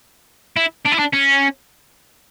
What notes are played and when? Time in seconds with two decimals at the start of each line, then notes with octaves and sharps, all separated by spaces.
0.56 E4
0.85 D4
0.92 E4
0.98 D4
1.13 C#4